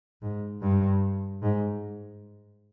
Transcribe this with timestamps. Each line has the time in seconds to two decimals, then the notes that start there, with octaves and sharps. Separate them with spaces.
0.22 G#2
0.61 G2
1.42 G#2